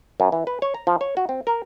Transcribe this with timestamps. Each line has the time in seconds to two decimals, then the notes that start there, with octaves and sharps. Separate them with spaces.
0.20 F#2
0.32 E3
0.47 B4
0.62 C#5
0.74 A#5
0.87 F3
1.01 C#5
1.17 F#4
1.29 C4
1.47 A#4